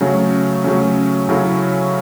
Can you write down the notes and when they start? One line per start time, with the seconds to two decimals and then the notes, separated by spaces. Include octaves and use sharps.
0.01 C#3 F#3 A3 C#4
0.64 C#3 F#3 A3 C#4
1.29 C#3 F#3 C#4 E4 A4